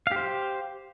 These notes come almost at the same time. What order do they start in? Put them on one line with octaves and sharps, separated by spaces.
F5 G4 C5